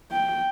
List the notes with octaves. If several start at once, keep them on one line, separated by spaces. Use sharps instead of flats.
G5